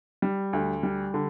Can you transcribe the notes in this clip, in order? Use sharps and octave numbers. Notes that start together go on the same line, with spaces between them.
G3
D2
G3
D3